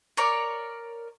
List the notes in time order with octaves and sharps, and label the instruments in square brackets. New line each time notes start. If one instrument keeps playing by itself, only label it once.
[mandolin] A#4 C#5 D5